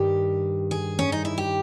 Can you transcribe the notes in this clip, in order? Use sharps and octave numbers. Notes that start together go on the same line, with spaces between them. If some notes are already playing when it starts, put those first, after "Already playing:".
Already playing: G2 D#3 G4
G#4
C#4
D#4
E4
G4